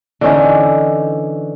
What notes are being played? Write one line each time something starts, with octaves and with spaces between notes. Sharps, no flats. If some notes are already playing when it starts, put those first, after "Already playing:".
D3 E3 C#4 D#4